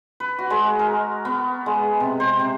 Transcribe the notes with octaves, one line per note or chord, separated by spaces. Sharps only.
B4
F#4
G#3
A#4
B3
G#3
C3
C5
C3